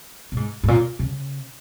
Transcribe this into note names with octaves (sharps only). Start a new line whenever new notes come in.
A#2
G#2
G#2
A#2
C#3